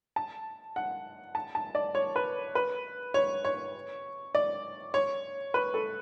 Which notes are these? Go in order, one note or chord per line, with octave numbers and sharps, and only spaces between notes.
A5
F#5
A5
A5
D5
C#5
B4
B4
C#5
C#5
D5
C#5
B4
A4